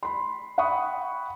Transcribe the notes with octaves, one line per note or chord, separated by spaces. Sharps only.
B5 C6
F#5 G5 B5 C#6 D#6